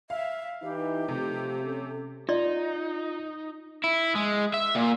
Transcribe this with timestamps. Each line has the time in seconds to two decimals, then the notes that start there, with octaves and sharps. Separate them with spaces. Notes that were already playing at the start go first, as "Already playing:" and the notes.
0.10 E5 F5
0.62 E3 D#4 G4
1.08 C3 F3 A3
1.63 C#4 A4
2.29 D#4 F4 D5 D#5 C6
3.84 E4
4.15 G#3
4.54 E5
4.76 A#2